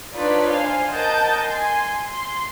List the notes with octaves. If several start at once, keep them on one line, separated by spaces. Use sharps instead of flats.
D4 D#4 F4 B4 C#5 D5
C5 F5 G#5
A#4 D#5 F#5 A5 G6 A6
G#5 C6
C6